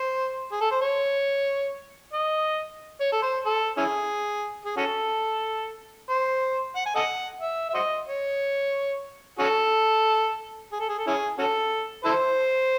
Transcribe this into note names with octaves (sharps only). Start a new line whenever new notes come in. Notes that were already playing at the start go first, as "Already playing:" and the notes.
Already playing: C5
G#4
A4
C5
C#5
D#5
C#5
A4
C5
A4
C#4 E4 G#4
G#4
C#4 F#4 A4
C5
F#5
G#5
A4 D#5 F#5
E5
E5
F#4 C5 D#5
C#5
C#4 F#4 A4
G#4
A4
G#4
A4
C#4 E4 G#4
C#4 F#4 A4
E4 A4 C5